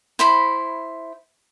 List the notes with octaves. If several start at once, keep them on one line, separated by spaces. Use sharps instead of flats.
E4 C5 B5